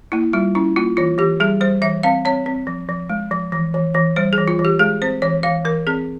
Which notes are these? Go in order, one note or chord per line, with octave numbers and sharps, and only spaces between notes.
A#3 E4
G3 F4
C#4 E4
A#3 F4
E3 F4
E3 G4
G3 G#4
G3 C5
E3 E5
C4 F5
C4 C#5
C4
F3
F3
G#3
F3
E3
E3
E3
G3 C5
G#4
E3
F4
E3
G4
G#3 G#4
C4 C5
E3 C#5
E3 F5
E3 A#4
C4 G#4